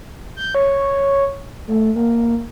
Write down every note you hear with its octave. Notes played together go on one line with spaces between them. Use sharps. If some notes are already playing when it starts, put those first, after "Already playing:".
G6
C#5
A3
A#3